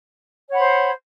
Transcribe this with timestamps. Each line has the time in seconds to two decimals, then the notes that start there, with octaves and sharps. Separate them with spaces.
0.48 C#5
0.52 F#5
0.55 B5
0.58 C5